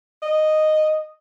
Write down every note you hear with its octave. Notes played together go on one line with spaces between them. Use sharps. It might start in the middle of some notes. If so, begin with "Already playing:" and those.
D#5